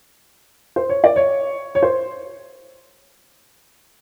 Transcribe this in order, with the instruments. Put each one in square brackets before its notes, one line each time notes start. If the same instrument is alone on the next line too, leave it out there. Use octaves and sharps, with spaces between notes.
[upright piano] C5
C#5
D5
C#5
C#5
C5